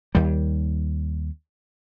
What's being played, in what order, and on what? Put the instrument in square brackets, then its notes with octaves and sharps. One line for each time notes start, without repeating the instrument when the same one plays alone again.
[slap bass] D#2 G3